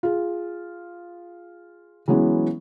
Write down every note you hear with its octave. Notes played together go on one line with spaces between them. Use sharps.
F4 G#4
E3 F#3 G#3 B3 C#4